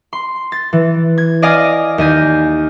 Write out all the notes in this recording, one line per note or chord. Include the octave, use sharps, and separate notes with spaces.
C6
A6
E3
G#6
D5 D#5 F5 G#5 D#6
D#2 D#5 G#5 G6